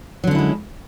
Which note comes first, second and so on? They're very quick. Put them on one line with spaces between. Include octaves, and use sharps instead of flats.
F#3 D3 C#4 E4 G#3